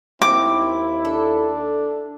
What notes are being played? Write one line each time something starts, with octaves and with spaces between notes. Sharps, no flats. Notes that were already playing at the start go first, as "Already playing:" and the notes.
D#2 C4 E4 D6
D4 A4